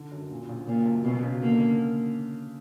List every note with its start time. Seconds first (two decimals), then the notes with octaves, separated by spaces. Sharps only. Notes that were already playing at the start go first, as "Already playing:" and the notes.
Already playing: D3
0.12 F#2
0.31 A#2
0.49 A#1
0.67 A#2 C#3
0.86 F#2
1.04 B2 F#3
1.23 C#3
1.42 D3 A#3